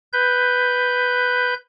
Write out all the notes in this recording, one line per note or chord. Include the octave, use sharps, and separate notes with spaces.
B4 G6